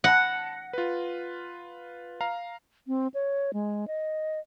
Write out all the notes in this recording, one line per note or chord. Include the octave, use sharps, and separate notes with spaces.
F#5 A5 B5 A#6
F4 B4
F5 A#5
C4
C#5
G#3
D#5